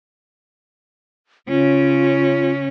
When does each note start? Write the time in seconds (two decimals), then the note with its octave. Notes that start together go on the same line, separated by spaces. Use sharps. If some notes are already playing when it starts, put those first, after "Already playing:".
1.48 C#3 C#4 F4